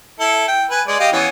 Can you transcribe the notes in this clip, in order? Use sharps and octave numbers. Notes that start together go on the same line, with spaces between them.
E4 A4
G5
B4 G#5
G#3 D5
G4 D#5 F5
E3 B3 C#4